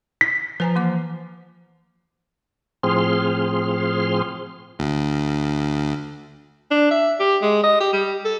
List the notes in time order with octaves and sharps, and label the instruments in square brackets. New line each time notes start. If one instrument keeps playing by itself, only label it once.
[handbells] B6
[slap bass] F3 [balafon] B4 G#5 A#5
[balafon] E3 A#3 D6
[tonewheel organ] A2 F3 C4 G#4 C6 F6
[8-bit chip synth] D2
[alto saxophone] D4
E5
G4
G#3
D#5
G4
G3
A4